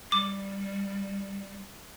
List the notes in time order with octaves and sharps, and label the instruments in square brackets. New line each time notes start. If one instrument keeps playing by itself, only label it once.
[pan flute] G3 [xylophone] D6